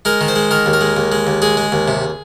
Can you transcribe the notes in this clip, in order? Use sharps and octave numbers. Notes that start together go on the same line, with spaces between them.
G#3 A#4
D#3
C5
G#3
D#3 A#4
D#2
A#4
G#3
D#2
G#3
D#2
G#3 G#4
G#3
D#2
C3